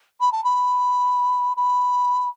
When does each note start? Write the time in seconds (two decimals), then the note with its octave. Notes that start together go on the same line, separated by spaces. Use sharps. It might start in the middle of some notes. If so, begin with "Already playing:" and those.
0.21 B5
0.32 A5
0.44 B5
1.57 B5